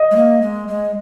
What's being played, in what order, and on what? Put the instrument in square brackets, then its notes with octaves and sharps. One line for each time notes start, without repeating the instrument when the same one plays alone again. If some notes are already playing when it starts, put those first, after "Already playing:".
Already playing: [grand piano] D#5
[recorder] G#3
A#3
G#3
G#3